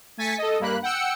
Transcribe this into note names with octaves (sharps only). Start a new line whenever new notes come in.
A3 G#5 A6 B6 C#7
A4 D#5
G2 A#3 B5 F#6
F#5 G5 E6 C#7